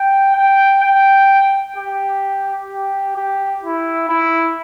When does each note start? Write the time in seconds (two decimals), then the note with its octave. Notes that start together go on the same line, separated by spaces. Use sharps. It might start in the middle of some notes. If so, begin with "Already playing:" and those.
Already playing: G5
0.37 G5
0.83 G5
1.77 G4
2.70 G4
3.16 G4
3.64 E4
4.09 E4